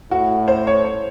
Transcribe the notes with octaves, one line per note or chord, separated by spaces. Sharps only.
A2 F#4
C5
C#5
C#5